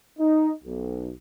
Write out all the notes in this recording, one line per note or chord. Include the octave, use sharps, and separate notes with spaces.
D#4
B1